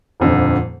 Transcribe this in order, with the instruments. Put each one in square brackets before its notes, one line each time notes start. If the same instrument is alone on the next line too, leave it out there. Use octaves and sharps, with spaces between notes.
[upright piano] D#1 F2 D3